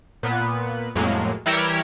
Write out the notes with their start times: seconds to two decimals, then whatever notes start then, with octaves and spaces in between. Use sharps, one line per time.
0.23 A#2 B3 B4
0.95 F2 A2 F#3 G#3 A#3
1.46 E3 G3 E4 G4 A#4 C#5